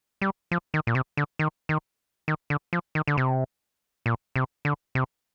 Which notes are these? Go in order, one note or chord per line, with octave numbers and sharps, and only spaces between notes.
G3
F3
D#3
A#2
C3
D3
D#3
D#3
D#3
D3
F3
D#3
D3
C3
A#2
C3
D3
C3